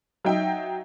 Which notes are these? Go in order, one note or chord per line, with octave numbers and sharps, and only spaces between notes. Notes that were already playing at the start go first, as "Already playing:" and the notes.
F#3 D#4 E5 G5